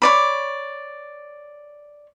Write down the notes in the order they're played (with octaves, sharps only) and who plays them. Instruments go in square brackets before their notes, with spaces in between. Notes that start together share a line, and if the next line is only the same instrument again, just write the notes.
[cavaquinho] C#5 D5 B5